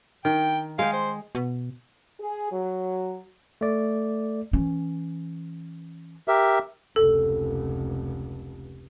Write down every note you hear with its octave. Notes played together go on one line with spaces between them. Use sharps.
D#3 G5
G#3 F5 G5
C5
B2
G#4
F#3
A3 D5
E3 C#4
G4 A#4 E5
F1 C#2 A4